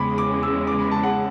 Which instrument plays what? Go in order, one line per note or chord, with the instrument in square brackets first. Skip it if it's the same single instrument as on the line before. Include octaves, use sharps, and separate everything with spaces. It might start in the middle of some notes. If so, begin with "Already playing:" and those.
Already playing: [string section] E2 C#3 G#3 [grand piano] B5 D6
[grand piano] D6
E6
D6
B5
A5
F#5